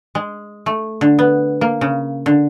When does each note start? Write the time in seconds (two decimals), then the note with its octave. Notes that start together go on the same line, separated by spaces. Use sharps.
0.15 G#3
0.66 A3
1.01 D3
1.19 B3
1.61 A#3
1.81 C#3
2.26 D3